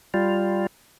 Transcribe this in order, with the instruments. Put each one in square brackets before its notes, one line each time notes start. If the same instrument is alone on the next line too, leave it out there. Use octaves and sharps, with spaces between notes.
[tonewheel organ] G3 F4